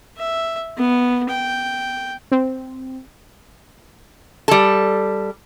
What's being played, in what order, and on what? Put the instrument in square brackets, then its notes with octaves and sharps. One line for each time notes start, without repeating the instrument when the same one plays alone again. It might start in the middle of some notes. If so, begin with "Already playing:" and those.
[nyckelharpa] E5
B3
G5
[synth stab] C4
[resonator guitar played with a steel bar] G3 A4